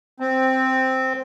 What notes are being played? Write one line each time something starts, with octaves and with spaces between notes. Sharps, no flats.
C4